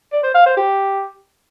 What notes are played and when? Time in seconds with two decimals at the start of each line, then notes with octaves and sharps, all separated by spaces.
0.12 D5
0.23 C5
0.35 F5
0.46 C5
0.57 G4